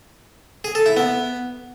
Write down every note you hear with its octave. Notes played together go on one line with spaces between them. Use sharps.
G#4
A4
E4
B3